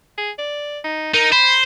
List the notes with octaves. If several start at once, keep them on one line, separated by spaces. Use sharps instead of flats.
G#4
D5
D#4
D#4 A#4
C5 B5